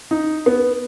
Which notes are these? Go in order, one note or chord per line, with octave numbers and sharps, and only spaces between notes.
D#4
B3